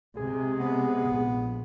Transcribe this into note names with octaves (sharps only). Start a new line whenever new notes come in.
C3 G#3 G#4
B3
A#1